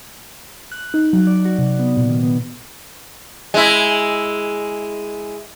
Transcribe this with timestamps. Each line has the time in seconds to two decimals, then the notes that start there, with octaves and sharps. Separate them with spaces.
0.72 F#6
0.94 D#4
1.13 F#3
1.27 D5
1.45 F#4
1.59 C3
1.79 B3
1.97 A#2
2.09 D#3
2.23 B3
3.54 G#3 E4